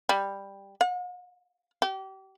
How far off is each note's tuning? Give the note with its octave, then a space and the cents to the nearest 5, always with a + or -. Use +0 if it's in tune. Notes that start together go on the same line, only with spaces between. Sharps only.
G3 +10
F#5 -45
G4 -35